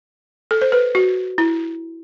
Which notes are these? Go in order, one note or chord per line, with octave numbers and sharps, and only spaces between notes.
A4
C5
B4
F#4
E4